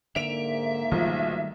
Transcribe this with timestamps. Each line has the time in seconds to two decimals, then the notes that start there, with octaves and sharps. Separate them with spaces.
0.16 G#2 D3 A#3 E5 D7 F7
0.92 B1 D#3 F3 G3 A3